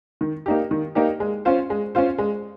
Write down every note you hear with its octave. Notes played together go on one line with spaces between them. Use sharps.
D#3
A#3 D#4 G4
D#3
A#3 D#4 G4
G#3
C#4 F4 C5
G#3
C#4 F4 C5
G#3